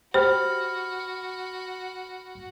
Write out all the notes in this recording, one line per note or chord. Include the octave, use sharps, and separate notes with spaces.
F#4 G4 C5 B5 F6